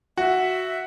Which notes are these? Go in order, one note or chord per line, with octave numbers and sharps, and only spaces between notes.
F#4 E5